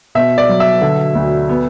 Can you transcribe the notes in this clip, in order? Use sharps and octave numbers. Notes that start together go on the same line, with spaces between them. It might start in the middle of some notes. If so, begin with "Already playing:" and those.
B2 E5
D5
F#3
E5
D3
D2
B3